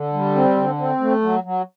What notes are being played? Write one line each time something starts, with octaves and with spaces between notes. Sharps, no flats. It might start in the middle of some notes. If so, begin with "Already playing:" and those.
Already playing: D3
G3
C4
D3
C4
A3
F#3
F#3